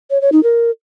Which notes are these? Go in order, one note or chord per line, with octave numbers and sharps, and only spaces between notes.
C#5
C#5
D#4
A#4